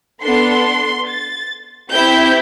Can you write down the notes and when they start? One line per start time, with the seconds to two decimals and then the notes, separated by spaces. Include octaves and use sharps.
0.23 B3 D4 A4 C6
1.08 A6
1.92 C4 E4 G4 G6